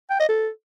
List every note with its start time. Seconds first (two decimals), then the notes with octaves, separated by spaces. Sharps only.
0.11 G5
0.20 D#5
0.29 A4